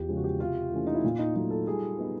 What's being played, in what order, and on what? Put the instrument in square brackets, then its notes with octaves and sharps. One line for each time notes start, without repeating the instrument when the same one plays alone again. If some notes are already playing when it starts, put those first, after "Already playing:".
Already playing: [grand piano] E2 [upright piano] F4 G4
[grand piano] C#3 F3 G#3
[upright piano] F#4
G4
[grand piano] C3 [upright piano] F4
[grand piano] E3 A3 C#4
[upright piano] D#4
E4
[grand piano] A#2 [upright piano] F4
[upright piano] D#4
[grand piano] F#3 A3 [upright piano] D#4
[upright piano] A4
[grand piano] G3 [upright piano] G#4
[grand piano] B3 D#4 G4